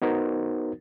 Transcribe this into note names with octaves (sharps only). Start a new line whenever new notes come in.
B3 D#4 F#4 A#4 C5